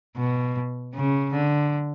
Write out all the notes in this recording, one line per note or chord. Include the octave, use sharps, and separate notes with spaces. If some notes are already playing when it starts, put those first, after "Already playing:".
B2
C#3
D3